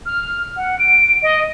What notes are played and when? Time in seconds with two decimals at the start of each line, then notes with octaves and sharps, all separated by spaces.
0.06 F6
0.57 F#5
0.79 D7
1.23 D#5